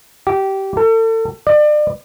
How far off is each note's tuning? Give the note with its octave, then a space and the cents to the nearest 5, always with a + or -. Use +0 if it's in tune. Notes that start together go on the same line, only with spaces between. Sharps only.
G4 -20
A4 +40
D5 +35